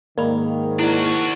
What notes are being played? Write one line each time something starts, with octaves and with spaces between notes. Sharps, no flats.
G#2 D#3 A#3 D5 B5
D4 E4 F#4 D5